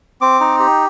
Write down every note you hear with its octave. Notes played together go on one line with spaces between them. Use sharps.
C4 D6
D#4
G4